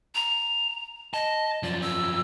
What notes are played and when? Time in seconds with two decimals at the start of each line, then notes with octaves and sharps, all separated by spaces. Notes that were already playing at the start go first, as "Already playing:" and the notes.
0.15 A#5
1.14 D#5 A5
1.63 F#2 F3 D5
1.82 E6